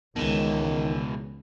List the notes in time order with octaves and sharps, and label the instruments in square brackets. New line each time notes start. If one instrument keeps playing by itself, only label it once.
[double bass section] C#2 [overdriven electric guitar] B2 E3 [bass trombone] D#3